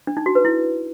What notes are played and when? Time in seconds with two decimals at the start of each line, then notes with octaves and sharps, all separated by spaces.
0.07 D4
0.17 D#4
0.26 F#4
0.35 B4
0.45 E4